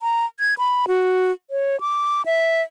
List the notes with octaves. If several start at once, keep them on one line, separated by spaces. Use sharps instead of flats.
A#5
G#6
B5
F#4
C#5
D6
E5